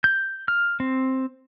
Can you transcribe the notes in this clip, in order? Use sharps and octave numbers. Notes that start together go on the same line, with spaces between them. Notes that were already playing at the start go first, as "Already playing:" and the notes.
G6
F6
C4